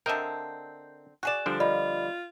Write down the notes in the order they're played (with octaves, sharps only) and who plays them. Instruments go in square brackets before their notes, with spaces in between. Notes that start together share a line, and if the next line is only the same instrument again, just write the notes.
[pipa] D3 C4 [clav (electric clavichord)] A#4 D#5 E5 [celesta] G6
[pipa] F#4 G#4 D5 [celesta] F#6 E7
[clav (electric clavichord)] D3 F3 G3 [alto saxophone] D4
[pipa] A#3 [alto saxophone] F4 [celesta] D5 D#5 B5